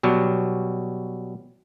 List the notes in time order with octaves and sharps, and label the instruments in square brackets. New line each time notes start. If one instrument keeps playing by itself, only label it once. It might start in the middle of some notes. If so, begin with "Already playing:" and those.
[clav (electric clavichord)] B2 F#3 G3